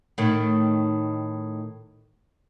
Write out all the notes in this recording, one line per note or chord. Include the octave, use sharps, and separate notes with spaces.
A2 D#3